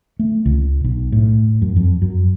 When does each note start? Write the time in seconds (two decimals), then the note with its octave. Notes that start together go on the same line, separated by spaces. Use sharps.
0.19 A3
0.46 C#2
0.84 B1
1.12 A2
1.62 F#2
1.76 F2
2.02 F#2